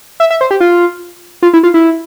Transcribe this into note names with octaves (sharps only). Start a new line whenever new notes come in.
E5
E5
C5
G4
F4
F4
E4
F4
E4